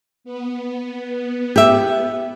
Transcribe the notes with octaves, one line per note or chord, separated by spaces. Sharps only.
B3
G4 E5